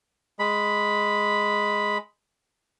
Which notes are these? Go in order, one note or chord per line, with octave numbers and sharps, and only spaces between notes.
G#3 B5